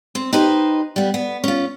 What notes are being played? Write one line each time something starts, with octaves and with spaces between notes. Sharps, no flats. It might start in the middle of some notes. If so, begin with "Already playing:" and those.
C4
D#4 G4 B4 C5 D#5
G3 B3
B3
C#4 F4